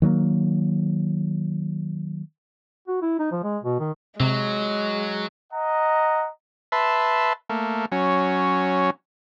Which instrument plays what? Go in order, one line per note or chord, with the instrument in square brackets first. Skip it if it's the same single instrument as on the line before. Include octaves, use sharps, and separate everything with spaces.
[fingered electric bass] D#3 F#3 A3 A#3
[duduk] F#4
E4
D#4
F3
G#3
B2
D#3
[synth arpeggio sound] C3 [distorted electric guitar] F#3 [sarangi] G#3
[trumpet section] D#5 F#5 A#5
[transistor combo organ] B4 E5 A5 C6
A3 A#3
F#3 C#4